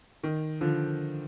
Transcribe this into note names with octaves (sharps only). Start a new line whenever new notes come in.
D#3
D3 F3